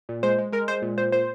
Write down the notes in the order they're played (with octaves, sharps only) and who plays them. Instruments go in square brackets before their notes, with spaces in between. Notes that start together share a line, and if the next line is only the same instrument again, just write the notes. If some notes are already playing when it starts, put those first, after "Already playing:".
[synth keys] A#2
G#3 C5
G#3
G#3 A#4
G#3 C5
A#2
A#2 C5
A#2 C5